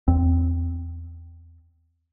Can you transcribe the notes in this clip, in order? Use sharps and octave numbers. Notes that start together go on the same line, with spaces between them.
E2 C4